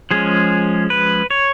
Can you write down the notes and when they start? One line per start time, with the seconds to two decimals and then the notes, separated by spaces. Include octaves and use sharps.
0.11 F3 G#3 C#4 G#4
0.90 B4
1.30 C#5